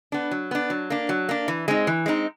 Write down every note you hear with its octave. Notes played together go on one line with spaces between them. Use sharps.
B3 D4
F#3
B3 D4
F#3
A#3 D4
F#3
A#3 D4
E3
G#3 C4 D#4
E3
G#3 C4 D#4